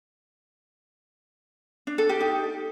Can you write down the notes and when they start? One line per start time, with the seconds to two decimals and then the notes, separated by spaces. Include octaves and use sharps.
1.87 D4
1.98 A4
2.09 G4
2.21 D#4